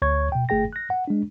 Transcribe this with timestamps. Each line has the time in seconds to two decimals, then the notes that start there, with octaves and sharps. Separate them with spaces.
0.02 D2 C#5 C#6 G#6
0.32 B2 G5
0.49 G1 A3 G#4 G5 A#6
0.73 F#6 A#6
0.90 F#5
1.08 G#3 D4